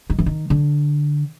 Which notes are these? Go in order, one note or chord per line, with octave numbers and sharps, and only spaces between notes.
D#3
E3
D#3
D3